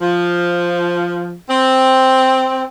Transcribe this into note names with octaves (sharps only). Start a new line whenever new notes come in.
F3
C4